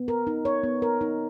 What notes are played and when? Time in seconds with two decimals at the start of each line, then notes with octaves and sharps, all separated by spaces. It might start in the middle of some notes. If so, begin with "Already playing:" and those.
Already playing: B3
0.08 A#4
0.27 D#4
0.45 C#5
0.64 B3
0.82 A#4
1.01 D#4